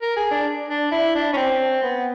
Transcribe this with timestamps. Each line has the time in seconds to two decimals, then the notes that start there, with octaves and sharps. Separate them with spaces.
0.02 A#4
0.17 G#4
0.31 D4
0.70 D4
0.91 E4
1.15 D4
1.33 C#4
1.37 C4
1.83 B3